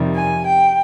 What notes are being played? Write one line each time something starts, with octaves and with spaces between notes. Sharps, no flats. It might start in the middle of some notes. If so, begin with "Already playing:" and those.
Already playing: F2 C3 D#3 G3
G#5
G5